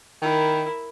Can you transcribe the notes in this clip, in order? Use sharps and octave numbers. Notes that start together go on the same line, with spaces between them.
D#3 E4 A#4